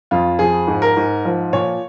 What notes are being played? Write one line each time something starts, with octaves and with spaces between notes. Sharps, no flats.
F2 F4
F3 G#4
G#2
A#4
G#2
F3
A#2 C#5